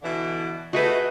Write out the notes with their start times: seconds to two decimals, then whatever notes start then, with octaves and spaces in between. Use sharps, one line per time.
0.02 B2 D3 E3
0.73 A3 F#4 G#4 B4 D#5